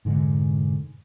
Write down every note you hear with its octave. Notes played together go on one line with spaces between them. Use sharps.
F1 G#2 D3 G#3